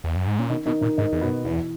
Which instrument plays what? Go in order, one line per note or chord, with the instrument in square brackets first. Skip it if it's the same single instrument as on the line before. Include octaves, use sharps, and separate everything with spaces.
[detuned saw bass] E2
F#2
G#2
[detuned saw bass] A#2 [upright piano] C#4
[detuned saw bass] B2 [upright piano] D#3 D#4
[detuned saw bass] B2 [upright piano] D#3 D#4
[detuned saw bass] A#2 [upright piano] D#3 D#4
[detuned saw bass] G#2 [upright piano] D#3 D#4
[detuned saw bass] E2
[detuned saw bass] F#2 [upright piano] B2 B3
[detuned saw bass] E2 [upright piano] E3 E4